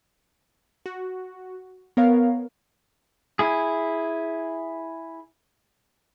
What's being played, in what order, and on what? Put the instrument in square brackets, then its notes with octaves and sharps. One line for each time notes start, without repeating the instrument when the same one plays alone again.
[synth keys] F#4
B3 A#4 C#5 F5
[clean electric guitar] E4 G#4